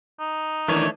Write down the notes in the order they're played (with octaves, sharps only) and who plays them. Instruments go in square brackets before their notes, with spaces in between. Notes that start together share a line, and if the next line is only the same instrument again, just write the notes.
[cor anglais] D#4
[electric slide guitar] D#3 E3 D4 [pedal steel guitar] A3 C#5